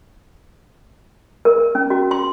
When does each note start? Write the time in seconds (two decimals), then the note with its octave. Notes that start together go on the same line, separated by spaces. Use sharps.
1.45 A#4
1.75 C#4
1.90 F#4
2.11 C6